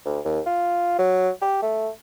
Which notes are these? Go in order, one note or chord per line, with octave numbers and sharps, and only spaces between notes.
D2
D#2
F4
F#3
G4
A3